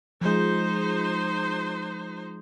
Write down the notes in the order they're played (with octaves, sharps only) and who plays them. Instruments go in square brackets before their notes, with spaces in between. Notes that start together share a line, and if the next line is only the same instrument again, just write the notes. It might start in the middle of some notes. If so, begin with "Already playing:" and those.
[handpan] F3 G#3 [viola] D#4 C5